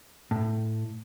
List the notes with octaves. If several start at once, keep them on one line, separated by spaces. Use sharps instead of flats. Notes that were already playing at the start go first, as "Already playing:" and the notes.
A2